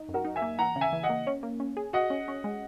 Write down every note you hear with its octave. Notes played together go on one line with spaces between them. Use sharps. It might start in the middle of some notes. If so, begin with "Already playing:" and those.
Already playing: D#4
F#2
F#4 A#4
D#4
E5 G#5
A#3
E3 F#5 A#5
C#3
E5 G#5
E3
D#5 F#5
A#3
C#4
A#3
C#4
G#4
F#4 D#5 F#5
C#4
C#4
G#3